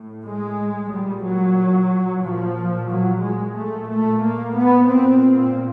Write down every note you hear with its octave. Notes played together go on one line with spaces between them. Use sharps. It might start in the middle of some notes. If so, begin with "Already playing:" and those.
Already playing: A2
G#3
A#2 G3
F#3
A#2 F3
F#3
G#3
A#2 A3
A3
A#3
B3
A#2 C4